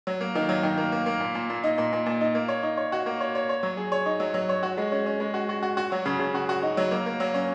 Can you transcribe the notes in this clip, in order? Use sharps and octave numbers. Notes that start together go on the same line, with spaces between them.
F#3
A#3
D#3
F#3
D#3
A#3
A#3
A#3
A#2
A#2
A#2
D#4
A#2
A#2
A#2
D#4
A#3
C#5
D#4
C#5
F#4
A#3
C#5
C#5
C#5
F#3
G#4
C#5
D#4
F#3
F#3
C#5
F#4
G#3
C#4
C#4
G#3
F#4
F#4
F#4
F#4
F#3
C#3
C#3
F#4
F#4
D#4
F#3
A#3
A#3
F#3
C#4